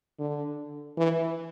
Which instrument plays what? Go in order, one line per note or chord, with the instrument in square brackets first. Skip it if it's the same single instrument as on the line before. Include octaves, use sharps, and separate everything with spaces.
[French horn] D3
E3